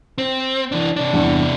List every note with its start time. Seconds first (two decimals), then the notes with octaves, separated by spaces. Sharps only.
0.18 C4
0.72 E3 D4
0.96 C3 D4
1.13 E2 G2